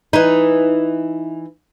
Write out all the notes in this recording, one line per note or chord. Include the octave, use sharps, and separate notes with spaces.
E3 D#4